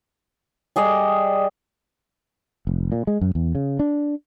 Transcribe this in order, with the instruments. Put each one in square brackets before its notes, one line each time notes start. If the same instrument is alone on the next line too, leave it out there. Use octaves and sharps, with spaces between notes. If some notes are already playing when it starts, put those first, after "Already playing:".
[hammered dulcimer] G3 G#4 D5 D#5
[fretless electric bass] F1
A#2
G#3
F#2
E2
C#3
D4